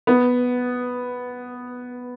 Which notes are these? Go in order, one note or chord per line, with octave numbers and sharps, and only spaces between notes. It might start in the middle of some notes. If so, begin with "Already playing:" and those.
B3